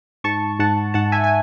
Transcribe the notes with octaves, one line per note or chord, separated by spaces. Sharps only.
G#2 A5 C#6
G#2 F#5 A5
G#2 F#5 A5
E5 G#5
G#5